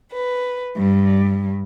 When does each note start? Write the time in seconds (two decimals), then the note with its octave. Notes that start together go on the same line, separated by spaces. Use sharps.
0.12 B4
0.77 G2